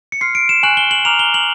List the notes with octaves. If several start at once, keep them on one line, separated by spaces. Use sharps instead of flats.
C#7
C6 F6 C7
D7
E7
G#5 C#6 F#6 F#7
G7
F#7
A#5 D6 F6 F7
G7
F#7